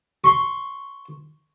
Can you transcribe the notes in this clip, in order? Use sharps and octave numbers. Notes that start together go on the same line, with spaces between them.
C6 C#6